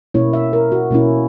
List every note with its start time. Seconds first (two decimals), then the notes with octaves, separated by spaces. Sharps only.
0.14 B2 A#3 C#4 E4 C#5
0.33 E5
0.53 A#4
0.72 F#4
0.91 B2 A#3 C#4 E4